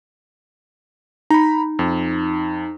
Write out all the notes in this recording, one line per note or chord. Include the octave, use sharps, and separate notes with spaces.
D#4 A#5 B5
F2